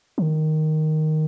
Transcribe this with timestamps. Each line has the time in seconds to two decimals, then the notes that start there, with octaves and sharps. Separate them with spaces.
0.18 F3
0.22 D#3